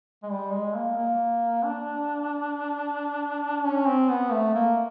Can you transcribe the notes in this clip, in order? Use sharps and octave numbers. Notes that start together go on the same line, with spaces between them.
G#3
G3
G#3
A#3
A#3
D4
C#4
C4
B3
A3
A#3